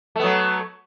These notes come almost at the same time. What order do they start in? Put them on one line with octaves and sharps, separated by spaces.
A3 B3 F#3